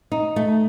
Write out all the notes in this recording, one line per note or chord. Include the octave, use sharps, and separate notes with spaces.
D#4
A3